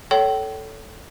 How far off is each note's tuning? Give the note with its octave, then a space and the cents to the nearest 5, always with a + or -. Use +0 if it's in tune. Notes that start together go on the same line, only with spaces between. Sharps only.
A4 +0 C#5 +20 G5 -35